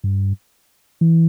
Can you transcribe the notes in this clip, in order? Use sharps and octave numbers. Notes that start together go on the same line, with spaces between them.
G2
E3